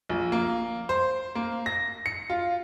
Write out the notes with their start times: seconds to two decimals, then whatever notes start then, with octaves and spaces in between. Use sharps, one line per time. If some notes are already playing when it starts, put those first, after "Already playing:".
0.09 A#1
0.32 A#3
0.89 C5
1.35 A#3
1.66 A#6
2.06 C#7
2.30 F4